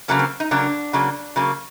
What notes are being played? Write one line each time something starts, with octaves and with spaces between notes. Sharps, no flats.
C#3 F#3 A#3 C#4
C4
D#4
C#3 F#3 A#3 D4
C#3 F#3 A#3
C#3 F#3 A#3